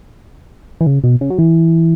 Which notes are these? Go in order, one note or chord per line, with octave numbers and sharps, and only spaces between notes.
E3
C#3
B2
C#3
F#3
E3